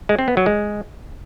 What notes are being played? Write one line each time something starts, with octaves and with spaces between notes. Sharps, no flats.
G#3
C4
B3
F#3
G#3